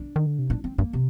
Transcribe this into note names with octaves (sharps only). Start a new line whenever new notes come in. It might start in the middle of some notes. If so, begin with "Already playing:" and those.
Already playing: D4
D#3
D3
C3
A#2 D4
C4
G2 A#3
C3